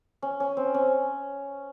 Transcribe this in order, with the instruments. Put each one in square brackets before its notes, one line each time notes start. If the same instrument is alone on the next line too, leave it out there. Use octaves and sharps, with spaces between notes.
[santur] C#4
C#4
C4
C#4